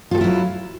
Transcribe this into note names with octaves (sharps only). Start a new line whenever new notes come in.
F#3 E4 F4 G4 A4